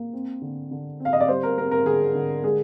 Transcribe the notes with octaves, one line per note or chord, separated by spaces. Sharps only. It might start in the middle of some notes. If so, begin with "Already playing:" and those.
Already playing: A#3
C4
D3
D3
C4
F5
D#5
D5
G3 C5
A#4
C4 A#4
A#4
D3 G#4
D3
G#3 G#4